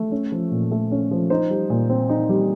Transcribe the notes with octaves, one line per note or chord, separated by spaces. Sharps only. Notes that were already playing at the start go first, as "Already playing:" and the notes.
Already playing: A3
C#4
F3
A#2
A3
C#4
F3
D#4 C5
G3
A#2
C4
D#4
G3